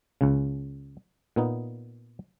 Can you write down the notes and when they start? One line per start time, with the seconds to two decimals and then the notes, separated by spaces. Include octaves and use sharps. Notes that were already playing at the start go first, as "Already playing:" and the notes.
0.21 C#2 C#3
1.36 A#2 B3 D#4